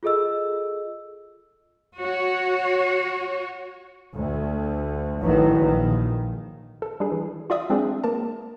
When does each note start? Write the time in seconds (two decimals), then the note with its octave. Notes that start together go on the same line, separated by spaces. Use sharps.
0.03 F4 G#4 A4 D#5 E6
1.98 F#4 C#5
4.15 D2
5.21 A1 D#3 E3 F#3
5.60 A#1 D#3
6.82 A4
7.00 G3 D4 G#4
7.12 E3
7.50 F4 F#4 D5 E5 D#6
7.70 G#3 C4 D4 F4 G#4 D5
8.04 A#3 A#4 A5